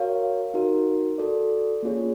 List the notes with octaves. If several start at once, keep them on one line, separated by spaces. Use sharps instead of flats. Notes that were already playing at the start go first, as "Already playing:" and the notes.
Already playing: F#4 A#4 C#5 F5
D#4 F#4 A#4
F#4 A4 D5
A#3 C#4 F4 G#4 C#5